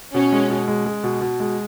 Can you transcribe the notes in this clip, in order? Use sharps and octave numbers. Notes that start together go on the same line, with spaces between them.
B2 C#4
G#3
B2
G#3
G#3
B2
B2
G#3